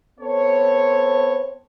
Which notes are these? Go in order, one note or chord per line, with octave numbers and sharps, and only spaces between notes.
B3 C4 A4 C5 C#5